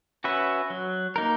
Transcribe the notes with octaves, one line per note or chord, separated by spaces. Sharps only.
C#4 F#4 B4 E5
F#3
A#3 D#4 A#4